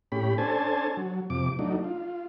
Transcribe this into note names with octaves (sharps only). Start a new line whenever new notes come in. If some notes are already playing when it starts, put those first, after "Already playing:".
A2 C#4 G4 B5
C#4 D4 A4 C5 G#5 A5
F#3
F2 C3 D6
F#3 A3 D4 D#4
F4